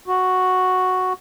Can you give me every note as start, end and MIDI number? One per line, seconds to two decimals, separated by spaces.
0.08 1.13 66